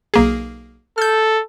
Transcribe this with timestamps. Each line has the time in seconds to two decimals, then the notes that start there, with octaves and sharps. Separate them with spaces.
0.14 B1 A#3 G#4
0.98 A4 F6 G6